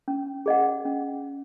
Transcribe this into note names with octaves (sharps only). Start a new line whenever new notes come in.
C#4
G#4 D#5 F#5
C#4